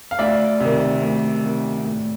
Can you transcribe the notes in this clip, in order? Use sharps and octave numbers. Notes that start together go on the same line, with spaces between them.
F5
D2 D5 E5
C3 D#3
D2
C3 D#3
A2